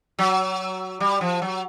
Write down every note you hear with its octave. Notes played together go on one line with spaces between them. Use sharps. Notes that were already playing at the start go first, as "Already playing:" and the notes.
F#3
G3
F3
F#3